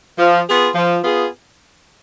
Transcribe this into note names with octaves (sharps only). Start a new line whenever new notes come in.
F3
B3 F4 G#4
F3
B3 F4 G#4